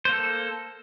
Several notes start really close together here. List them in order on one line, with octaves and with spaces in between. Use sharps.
C5 A#3 A4